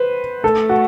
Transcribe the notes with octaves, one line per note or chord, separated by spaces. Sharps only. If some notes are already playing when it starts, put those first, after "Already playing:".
Already playing: B4 C5
A3 A4
F#4